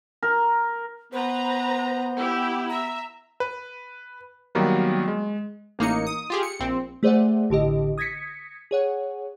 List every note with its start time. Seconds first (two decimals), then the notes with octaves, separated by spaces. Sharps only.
0.23 A#4
1.12 B3 B4 C5 A#5
2.17 E4 G4
2.69 E5 A#5
3.40 B4
4.55 D#3 F#3 G3 A#3 B3
5.08 G#3
5.79 A1 A#3 D#4 C#7
6.07 D#6
6.30 F4 G4 G#4
6.43 C#7
6.60 A#1 C4
7.03 A3 G#4 C5 D5 E5 F#5
7.50 A1 D3 G4 D#5
7.98 D#6 G#6 A#6 B6 C#7
8.71 G#4 C#5 F#5